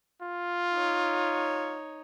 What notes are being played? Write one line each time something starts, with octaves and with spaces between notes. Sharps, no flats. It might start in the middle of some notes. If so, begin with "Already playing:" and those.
F4
D#4 C#5